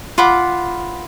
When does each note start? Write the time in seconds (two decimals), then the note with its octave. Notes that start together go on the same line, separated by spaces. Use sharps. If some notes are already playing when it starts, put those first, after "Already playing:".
0.18 F4 F#5 B5 D6